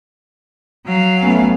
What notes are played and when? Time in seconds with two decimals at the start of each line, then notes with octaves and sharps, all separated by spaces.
0.86 F#3 F5
1.22 A3 B3 C#4